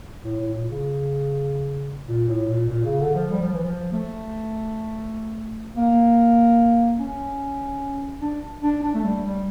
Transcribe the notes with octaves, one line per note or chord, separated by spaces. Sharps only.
A2
A2
A#2
C#3
A#2
A2
A#2
A#2
C#3
D3
F3
G3
F3
E3
F3
A3
A#3
C#4
D4
D4
D4
A3
G3
G3